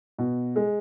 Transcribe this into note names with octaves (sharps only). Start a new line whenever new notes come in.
B2
G#3